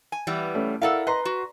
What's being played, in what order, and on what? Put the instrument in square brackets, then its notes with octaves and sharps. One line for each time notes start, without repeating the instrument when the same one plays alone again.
[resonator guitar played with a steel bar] G#5
E3 G3 B3
[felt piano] A3 C#4
[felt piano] E4 A#4 F#5 [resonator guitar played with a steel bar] A4 D5 F5
[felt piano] B4 A#5 C6 [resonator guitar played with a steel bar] D#5
[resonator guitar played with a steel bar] F#4